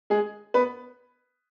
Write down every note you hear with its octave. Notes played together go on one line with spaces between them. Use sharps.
G#3 G#4
B3 B4